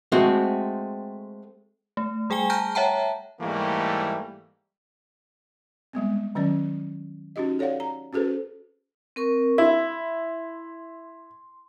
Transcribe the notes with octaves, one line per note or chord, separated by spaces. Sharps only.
G#3 A3 C4 F#4
A3
G3 G#4 G5 G#5 G7
A5 A#5 F6 G6 A#6
C#5 E5 F#5 G5 A5 A#5
G#2 E3 G3 A3 A#3
G3 G#3 B3 C4
D#3 F#3 C#4 D5
C#4 D#4 F#4 G4 D#5
A4 C#5 D5 F5 F#5
A#5
C#4 F#4 G#4 A4 B4 C5
C4 A#4 C#6
E4 C6